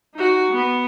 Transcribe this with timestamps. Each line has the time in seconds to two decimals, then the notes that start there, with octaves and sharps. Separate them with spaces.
0.15 D#4 F#4
0.51 B3